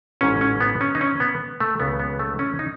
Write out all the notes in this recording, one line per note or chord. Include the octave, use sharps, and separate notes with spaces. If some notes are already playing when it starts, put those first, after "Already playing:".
A1 G#2 F#3 C#4
C#4
B3
C#4
D#4
C#4
B3
A3
C#2 C#3 F#3 B3
B3
A3
C#4
D#4